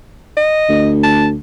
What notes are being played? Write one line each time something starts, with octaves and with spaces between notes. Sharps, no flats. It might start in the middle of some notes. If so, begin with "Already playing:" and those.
D#5
D2
A5